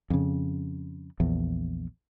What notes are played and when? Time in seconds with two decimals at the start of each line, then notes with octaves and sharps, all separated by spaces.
0.10 F2 C#3
1.20 A#1 E2